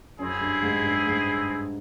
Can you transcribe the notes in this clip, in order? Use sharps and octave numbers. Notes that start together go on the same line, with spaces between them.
F#2 C4 E4 G#4
G2
G#2
G2
G#2